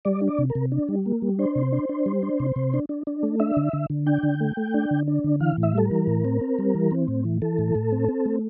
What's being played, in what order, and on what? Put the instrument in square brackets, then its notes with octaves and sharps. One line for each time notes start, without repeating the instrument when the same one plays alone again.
[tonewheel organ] G3 D5
D4
D5
C3
A#4
C3
D4
G3
A#3
G3
D4 C5
C3
D4
D4
G3
D4
C3
C3
D4
D4
D4
A3
D4 E5
D3
D3
D3
D4 G5
D3
A3
A3
D4
D3
D4
D3
E3 F5
A2
E5
G3 A4
A#4
E3
A2
C4
C4
G3
E3
C4
A2
E3
E3 A4
A2
A2
C4
C4
A3